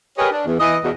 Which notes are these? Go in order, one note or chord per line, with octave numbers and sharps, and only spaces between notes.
G4 G#4 A#4 B4 C#5 D#5
D4
E2
E3 D#5
E2 B2